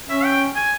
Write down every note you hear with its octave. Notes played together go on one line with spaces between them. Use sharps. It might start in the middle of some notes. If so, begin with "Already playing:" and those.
C#4 E5
G5
G#5